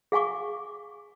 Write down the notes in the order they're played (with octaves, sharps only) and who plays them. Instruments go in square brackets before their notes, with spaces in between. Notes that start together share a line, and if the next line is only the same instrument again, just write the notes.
[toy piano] G#4 F5 G#5 C#6 D6